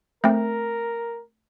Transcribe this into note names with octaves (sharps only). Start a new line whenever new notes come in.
A3 C4 A#4